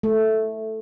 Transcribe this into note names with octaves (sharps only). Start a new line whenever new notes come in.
A3